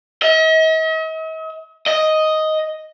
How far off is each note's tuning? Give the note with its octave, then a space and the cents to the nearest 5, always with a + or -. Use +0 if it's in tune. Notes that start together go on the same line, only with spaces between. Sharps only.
D#5 +45
D#5 +5